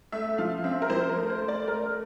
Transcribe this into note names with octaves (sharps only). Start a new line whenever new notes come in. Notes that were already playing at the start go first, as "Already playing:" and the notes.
A3 E5
F3 F5
C4 E5
A#4
F3 C5
A#4
A3
C5
A3
D5
A3 A#4